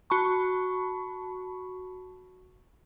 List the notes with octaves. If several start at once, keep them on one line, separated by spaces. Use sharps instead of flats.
F#4 A5 B5 C#6